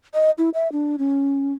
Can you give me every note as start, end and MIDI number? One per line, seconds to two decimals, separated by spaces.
0.14 0.31 75
0.38 0.50 64
0.54 0.71 76
0.72 0.96 62
0.98 1.53 61